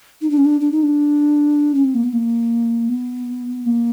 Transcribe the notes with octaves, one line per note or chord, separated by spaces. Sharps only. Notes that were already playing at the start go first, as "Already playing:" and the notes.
D#4
D4
C#4
D4
D4
D#4
D4
C#4
C4
A#3
B3
A#3
B3
A#3